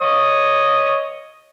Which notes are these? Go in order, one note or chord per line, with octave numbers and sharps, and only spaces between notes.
C#5 D#5 D#6